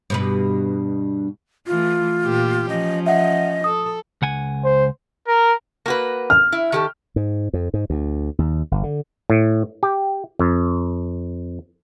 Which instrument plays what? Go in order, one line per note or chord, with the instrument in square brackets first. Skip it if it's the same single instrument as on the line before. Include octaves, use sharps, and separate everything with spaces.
[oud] G2 B2 B4
[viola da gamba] E3 A3 [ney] F4
[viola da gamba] A#2 A#3 G4
[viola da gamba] F3 C#4 [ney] D#5
[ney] D#5 [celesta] E5 F#5
[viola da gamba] A4 [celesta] D#6
[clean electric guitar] C#2 F#5 G#5
[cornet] C5
[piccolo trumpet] A#4
[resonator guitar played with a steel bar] A#3 F#4 B4
[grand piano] F6
[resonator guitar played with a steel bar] E4
D#3 G4 A4
[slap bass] G#2
F2
G#2
D2
D#2
G1
D3
[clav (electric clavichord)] A2
G4
F2